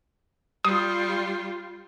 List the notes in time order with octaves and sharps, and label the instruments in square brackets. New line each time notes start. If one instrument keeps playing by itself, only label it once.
[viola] G3 F4 [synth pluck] D#6